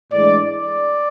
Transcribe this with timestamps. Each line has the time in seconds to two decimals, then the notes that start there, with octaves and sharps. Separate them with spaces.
0.12 A2 E3 G#3 D4 D5
0.50 D5